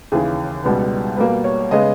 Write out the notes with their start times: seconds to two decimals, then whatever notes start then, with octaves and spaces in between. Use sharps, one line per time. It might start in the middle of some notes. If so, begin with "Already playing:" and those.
0.12 D#2 C#3 E3 G#4
0.64 C#2 B2 G3 B3
1.17 B2 G3 A#3 B4
1.44 C#5
1.71 C#3 G#3 B3 D#5